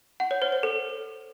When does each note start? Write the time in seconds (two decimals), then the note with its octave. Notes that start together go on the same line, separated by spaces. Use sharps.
0.20 F#5
0.31 C#5
0.42 C5
0.52 C5
0.63 A4